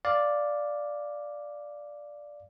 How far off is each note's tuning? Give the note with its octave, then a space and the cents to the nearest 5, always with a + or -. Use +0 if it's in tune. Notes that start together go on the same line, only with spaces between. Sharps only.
D5 +0 F5 +0